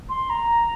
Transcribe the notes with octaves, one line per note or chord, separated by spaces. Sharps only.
C6
A#5